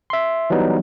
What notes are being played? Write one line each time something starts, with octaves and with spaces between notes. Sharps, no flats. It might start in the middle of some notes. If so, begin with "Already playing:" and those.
E5 C6
E3 F#3 G3 B3 D#4